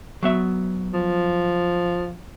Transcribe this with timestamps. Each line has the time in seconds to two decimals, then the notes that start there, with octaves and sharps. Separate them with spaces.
0.23 F#3 B3 E5
0.93 F3